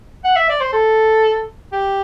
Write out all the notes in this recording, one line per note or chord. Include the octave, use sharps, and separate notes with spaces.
F#5
E5
D5
C5
A4
G4